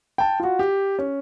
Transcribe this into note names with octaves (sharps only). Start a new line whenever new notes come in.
G5 A5
F4 F#4
G4
C#4